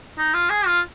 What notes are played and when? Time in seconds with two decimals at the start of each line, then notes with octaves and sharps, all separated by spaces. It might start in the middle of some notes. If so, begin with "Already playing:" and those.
0.18 D#4
0.34 F4
0.50 G#4
0.66 F4